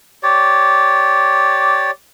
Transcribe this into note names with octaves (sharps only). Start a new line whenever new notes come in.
G4 C#5 D5